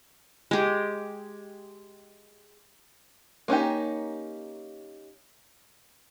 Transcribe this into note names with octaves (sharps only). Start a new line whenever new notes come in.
G#3 G4
A#3 C#4 D#4 G4